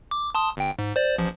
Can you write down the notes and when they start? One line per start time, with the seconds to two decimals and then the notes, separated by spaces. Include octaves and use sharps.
0.11 D6
0.35 A5 C6 D#6
0.57 G1 G5
0.79 G#2
0.96 C5 D5
1.18 A1 F3